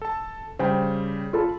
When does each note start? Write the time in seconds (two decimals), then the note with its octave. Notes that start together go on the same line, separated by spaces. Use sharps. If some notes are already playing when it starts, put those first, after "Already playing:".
0.02 A4 A5
0.59 C#3 G3 C5 G5
1.33 F4 A4 B5